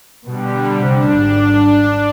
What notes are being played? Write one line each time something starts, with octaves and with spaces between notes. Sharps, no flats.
B2 D3 G3
C3 D4
G#1